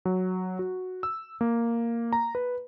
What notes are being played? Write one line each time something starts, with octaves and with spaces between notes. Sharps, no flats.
F#3
F#4
E6
A#3
A#5
B4